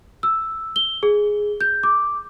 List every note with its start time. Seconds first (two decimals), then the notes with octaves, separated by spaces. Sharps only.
0.23 E6
0.76 G7
1.03 G#4
1.61 G6
1.83 D6